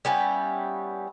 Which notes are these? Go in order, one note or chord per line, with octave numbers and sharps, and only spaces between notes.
G3 B3 C#4 E4